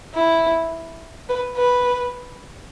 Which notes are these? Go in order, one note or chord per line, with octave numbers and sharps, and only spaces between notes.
E4
B4
B4